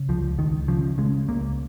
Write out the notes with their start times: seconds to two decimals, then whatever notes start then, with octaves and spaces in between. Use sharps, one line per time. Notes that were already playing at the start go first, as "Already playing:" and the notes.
Already playing: C#3
0.09 C#2 F3
0.38 C#2 D#3
0.68 C#3 F3
0.98 C#3 G#3
1.28 C#2 A#3